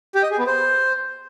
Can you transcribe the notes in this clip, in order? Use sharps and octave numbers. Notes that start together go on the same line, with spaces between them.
G4
D#5
G#4
B3
C5